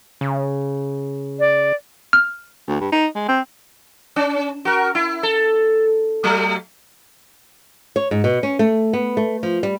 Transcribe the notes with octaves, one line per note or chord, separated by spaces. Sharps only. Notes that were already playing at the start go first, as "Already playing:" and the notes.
C#3
D5
F6
D2
G2
D#4
G#3
C4
C#4
F#4 A#4
E4
A4
F#3 A3
C#5
G#2
B2
C#4
A3
B3
A3
F3
G3